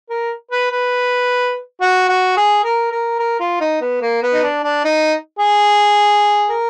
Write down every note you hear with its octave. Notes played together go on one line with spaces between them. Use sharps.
A#4
B4
B4
F#4
F#4
G#4
A#4
A#4
A#4
F4
D#4
B3
A#3
B3
D#4
D4
D4
D#4
G#4
A#4